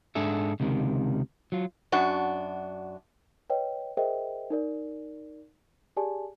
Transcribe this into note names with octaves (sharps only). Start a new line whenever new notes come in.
G#2 D4 G#4 A4 E5
C#2 C3 D#3
F#3 F4
F#2 D4 F#4
B4 C#5 D#5 G5
G#4 A#4 C5 D#5 E5 G5
D#4 A#4 D5
G4 G#4 D5 G#5 A5